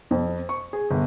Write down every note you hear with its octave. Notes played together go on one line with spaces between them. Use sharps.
F2
C#6
G#4
G1